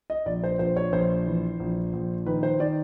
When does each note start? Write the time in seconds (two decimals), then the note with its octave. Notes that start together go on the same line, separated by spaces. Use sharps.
0.10 D#5
0.26 A#1 D5
0.44 C5
0.59 A#1 C5
0.77 C#5
0.92 A#1 C5
1.27 E3
1.60 A#1
1.93 A#1
2.26 D#3 B4
2.43 C5
2.60 D#3 D5